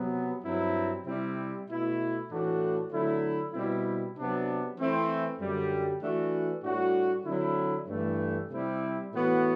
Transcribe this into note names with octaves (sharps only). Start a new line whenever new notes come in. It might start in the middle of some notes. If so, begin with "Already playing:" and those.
Already playing: C3 F#3 B3
G2 F#3 C4 E4
C3 G3 C4 E4
B2 A3 E4
A2 E3 A3 D4 F#4
D3 F#3 A3 E4
B2 G3 C4 E4
C3 F#3 B3 D4
E3 A3 C4 E4
F#2 D3 G3
E3 A3 D4 F#4
A2 G3 D4 F#4
D3 F#3 C4 E4
G2 E3 A3
C3 G3 C4 E4
A2 E3 B3 F#4